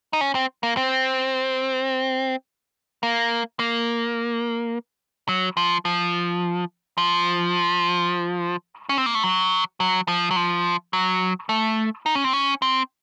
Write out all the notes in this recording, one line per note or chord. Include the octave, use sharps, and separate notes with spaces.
D#4
C#4
C4
A#3
C4
A#3
A#3
F#3
F3
F3
F3
C#4
C4
A#3
A3
F#3
F#3
F3
F#3
F3
F#3
A3
D#4
C#4
C4
C#4
C4